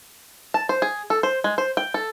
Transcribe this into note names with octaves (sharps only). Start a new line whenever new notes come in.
A5
C5
G#4
A4
C5
G#3
C5
G5
A4